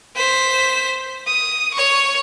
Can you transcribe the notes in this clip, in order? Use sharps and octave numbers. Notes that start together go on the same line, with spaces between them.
C5 B6
D#6
C#5 C#6